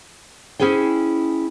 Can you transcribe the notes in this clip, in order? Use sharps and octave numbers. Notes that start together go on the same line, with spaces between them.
C#4 E4 G#4 C5 G5